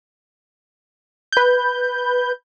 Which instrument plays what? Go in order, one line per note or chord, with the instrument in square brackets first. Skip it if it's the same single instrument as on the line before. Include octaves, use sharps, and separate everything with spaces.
[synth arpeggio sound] B4 G6